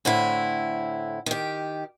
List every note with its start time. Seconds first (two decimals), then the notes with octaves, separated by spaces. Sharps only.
0.05 A2 D3 C4 E4
1.26 D#3 G4